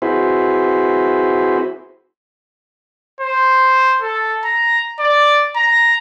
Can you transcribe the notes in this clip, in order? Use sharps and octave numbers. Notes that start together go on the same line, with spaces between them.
C4 E4 F#4 G#4 B4 C5
C5
A4
A#5
D5
A#5